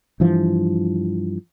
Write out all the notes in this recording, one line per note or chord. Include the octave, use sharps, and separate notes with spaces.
G2 E3 F3